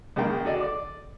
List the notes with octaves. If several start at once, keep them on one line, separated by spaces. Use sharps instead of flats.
A#1 C#3 G#3 A#3 G5
F#4 G#4 A4 D5 D#5
D5 D6